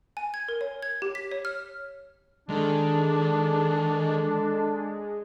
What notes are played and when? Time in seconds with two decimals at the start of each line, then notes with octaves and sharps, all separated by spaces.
0.17 G#5
0.34 G#6
0.49 A#4
0.61 C#5
0.83 G#6
1.02 G4
1.15 B6
1.32 C#5
1.45 F6
2.49 D#3 G#3 D4 A4